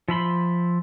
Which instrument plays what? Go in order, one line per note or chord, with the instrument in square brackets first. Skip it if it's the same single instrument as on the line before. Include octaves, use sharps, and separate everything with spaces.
[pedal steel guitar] F3 E5 B5 C6